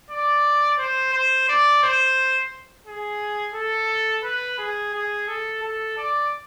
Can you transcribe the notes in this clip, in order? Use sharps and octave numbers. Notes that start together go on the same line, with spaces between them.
D5
C5
C5
D5
C5
G#4
A4
B4
G#4
G#4
A4
A4
D5